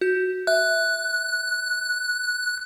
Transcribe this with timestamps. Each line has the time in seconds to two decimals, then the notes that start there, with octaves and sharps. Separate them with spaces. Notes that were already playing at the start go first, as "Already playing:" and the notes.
0.01 F#4 G6
0.47 E5 F#6